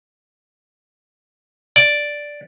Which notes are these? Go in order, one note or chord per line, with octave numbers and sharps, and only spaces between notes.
D5